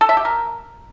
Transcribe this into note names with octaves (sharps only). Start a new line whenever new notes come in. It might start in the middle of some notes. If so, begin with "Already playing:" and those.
A4
E5
G4
A#4